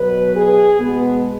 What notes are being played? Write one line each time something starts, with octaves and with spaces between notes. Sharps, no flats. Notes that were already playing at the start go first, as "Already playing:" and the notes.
Already playing: B2 F#3 B4
G#4
B2 G#3 B3